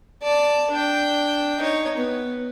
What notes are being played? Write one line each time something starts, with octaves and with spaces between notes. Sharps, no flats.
D5 A5
D4 G5
D#4 C#5
B3